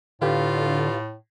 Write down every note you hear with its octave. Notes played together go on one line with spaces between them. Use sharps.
A2 D3 F4 G4 B4 F5